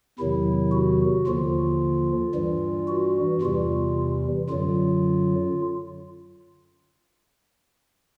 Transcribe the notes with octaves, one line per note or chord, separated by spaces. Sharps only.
E2 C3 D#3 F#3 E4
F#4
D#2 D3 F3 F4
G2 E3 G3
F#4
E2 C3 E3 G3 F4
F#2 D3 F#3 F4